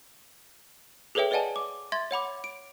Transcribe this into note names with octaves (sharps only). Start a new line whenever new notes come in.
G#4 A4 B4 C#5 E5 G5
B4 D5 D#5 F#5 G#5 A5
D6
E5 C6 G#6 A6
C#5 F#5 B5 D6
D7